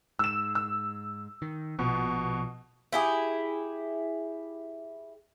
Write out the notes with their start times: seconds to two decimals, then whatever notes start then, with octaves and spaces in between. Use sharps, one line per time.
0.19 G#2 E6 E7
0.55 E6
1.42 D#3
1.79 A#1 B2 F3
2.93 E4 G4 G#4